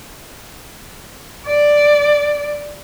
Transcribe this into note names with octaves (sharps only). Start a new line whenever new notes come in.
D5